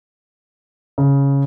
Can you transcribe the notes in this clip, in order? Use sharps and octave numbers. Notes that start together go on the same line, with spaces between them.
C#3